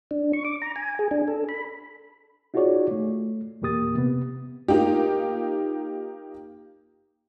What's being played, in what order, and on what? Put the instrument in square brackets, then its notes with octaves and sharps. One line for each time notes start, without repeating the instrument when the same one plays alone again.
[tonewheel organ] D4
C#6
D6
A#5
G#5
G#4
D4
A4
B5
[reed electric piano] D#4 F4 F#4 G#4 C#5 D5
A3
E2 A#2 A#3 G4 D#6 A6
C3 B3
[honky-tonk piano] A#3 D#4 F4 G4